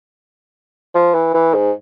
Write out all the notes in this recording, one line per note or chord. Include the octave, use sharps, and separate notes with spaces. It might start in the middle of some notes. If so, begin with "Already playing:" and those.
F3
E3
E3
G#2